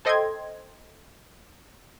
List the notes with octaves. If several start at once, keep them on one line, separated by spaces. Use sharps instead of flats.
A4 C5 D#5 G5 C6 G#6